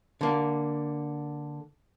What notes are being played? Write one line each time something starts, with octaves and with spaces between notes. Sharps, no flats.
D3 A#3